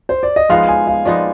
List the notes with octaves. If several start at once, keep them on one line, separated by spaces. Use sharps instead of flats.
C5
D5
D#5
F3 G#3 B3 D#4 F5
G#5
F5
F3 G#3 B3 D#4 D5